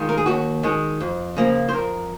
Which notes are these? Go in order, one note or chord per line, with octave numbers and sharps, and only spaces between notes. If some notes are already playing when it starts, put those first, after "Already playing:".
Already playing: D#3 G#3 F4
A#4
G#4
D#2 F#4
D#3 G#3
F2
C#3 F3 A#3
C5
F2 A#4